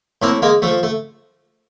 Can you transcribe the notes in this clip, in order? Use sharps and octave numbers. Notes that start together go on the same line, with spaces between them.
A2 A#3 C4
G#3 A#3
F3 A3
A3